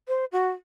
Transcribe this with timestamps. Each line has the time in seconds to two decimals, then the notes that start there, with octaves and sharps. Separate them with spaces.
0.08 C5
0.32 F#4